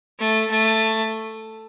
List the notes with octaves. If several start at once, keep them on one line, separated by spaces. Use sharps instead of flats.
A3
A3